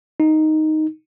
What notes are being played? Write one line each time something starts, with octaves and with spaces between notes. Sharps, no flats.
D#4